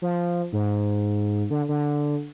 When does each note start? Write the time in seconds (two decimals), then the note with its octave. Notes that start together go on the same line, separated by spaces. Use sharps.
0.02 F3
0.53 G#2
1.50 D3
1.69 D3